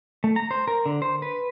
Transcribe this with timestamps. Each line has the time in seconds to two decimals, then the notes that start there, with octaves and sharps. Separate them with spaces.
0.24 A3
0.36 A#5
0.51 C5
0.68 A#4
0.86 D3
1.02 C5
1.22 B4